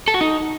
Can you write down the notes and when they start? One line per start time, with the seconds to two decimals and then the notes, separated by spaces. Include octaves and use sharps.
0.08 A4
0.14 F#4
0.21 D#4